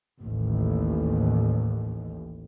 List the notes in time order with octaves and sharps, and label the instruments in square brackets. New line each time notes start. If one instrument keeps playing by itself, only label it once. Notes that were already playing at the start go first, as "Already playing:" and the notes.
[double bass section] A1 D#2